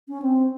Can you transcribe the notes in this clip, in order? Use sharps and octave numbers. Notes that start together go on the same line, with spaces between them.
C#4
C4